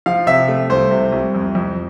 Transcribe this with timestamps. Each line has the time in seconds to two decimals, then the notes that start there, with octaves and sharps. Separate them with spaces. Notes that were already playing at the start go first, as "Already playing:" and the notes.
0.06 F3 F5
0.27 C3 E5
0.48 A3
0.70 C2 C5
0.91 C3
1.12 C2
1.35 F2
1.55 F2